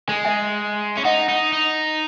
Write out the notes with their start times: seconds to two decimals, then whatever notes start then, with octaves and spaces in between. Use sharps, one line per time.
0.08 G#3 G#5
0.25 E5 G#5
0.97 C#4 E5
1.05 D#4 D#5 F#5
1.29 D#4
1.53 D#4